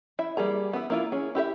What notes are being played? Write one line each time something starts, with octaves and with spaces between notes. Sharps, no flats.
E4 E5
G3 A#3 G#4 A#5
B3 E4
A#3 E4 F4
C#4 G#4
E4 G4 B4 E5